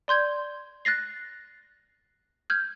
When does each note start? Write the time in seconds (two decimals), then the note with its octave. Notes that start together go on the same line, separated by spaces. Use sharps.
0.08 D5 C6 G6 G#6
0.85 F#6 A6 A#6 C7
2.50 F6 G6 G#6